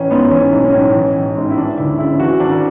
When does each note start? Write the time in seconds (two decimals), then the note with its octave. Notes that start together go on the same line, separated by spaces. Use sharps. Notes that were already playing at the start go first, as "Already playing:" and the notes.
Already playing: A1 E3 C#4
0.10 G#2 B3
0.31 E3 C#4
0.52 B1
0.63 C#4
0.73 A2
0.95 E3
1.16 A1
1.36 G#2
1.50 E4
1.57 E3 D4
1.78 D2 E4
1.98 C#3 E4
2.20 E3 F#4
2.40 G#1 D4